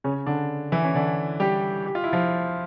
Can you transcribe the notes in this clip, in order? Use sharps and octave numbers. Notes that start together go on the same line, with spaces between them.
C#3 C#4
D3 D4
E3 E4
C#4
D3 D4
G3 G4
G4
F4
E4
F3 F4